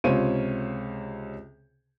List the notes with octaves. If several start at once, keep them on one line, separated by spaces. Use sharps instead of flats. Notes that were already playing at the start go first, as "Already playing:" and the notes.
C#2 C3 F4 C5 C#5 D#7